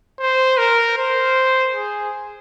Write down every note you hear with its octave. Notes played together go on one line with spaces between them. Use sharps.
C5
A#4
C5
G#4